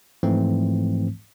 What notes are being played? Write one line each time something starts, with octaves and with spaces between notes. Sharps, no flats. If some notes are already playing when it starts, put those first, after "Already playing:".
G#2 E3 F3 A3 C4